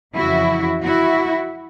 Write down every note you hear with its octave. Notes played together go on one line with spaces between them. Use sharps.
F2 C#3 E3 E4 F#4
E4 F#4